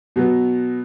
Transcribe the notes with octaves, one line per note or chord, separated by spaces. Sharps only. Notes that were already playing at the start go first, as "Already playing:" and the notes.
B2 F#3 B3